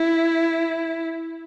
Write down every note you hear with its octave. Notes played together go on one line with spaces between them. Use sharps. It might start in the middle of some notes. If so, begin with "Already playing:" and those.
Already playing: E4